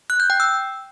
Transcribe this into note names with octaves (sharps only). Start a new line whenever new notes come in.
F#6
G6
G5
E6